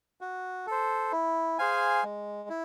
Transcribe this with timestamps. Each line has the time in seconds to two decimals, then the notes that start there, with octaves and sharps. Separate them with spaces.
0.21 F#4
0.67 A4 C5
1.12 E4
1.59 G#4 C5 F5 G#5
2.03 G#3
2.49 E4